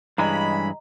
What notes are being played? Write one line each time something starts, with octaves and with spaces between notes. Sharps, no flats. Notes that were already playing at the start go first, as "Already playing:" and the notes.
G2 C#3 E3 G#3 D#5 A#5 B5